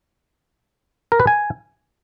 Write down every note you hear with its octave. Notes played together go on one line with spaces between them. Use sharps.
A#4
B4
G#5